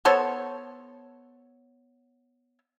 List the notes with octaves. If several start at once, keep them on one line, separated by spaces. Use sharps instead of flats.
B3 A4 C5 C#5